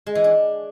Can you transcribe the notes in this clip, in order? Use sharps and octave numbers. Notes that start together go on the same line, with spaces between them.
G#3
E3
D4